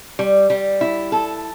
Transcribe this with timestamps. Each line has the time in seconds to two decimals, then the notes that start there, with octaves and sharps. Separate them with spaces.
0.19 G3
0.50 G3
0.81 E4
1.12 A4